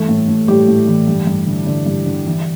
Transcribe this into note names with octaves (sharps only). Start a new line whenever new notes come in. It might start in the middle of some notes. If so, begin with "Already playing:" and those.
Already playing: G2 E3 A3 A4
A2
A2
A2 G3 G4
A2
E3
G2
G2
D3
D3
G2
D3
E3